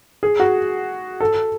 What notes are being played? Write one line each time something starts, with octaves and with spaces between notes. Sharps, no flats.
G#4
F#4
A4